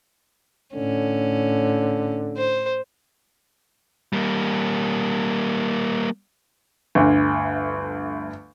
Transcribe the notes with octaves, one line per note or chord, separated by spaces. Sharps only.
A2 D3 C#4
C5
G3 A#3
G1 D2